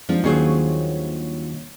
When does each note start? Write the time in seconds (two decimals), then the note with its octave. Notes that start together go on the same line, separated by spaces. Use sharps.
0.09 F3 G3 G#3 C4 D4 D#4 F4
0.24 D#2 F#3 A#3 C#4 D4 G#4 C5 C#5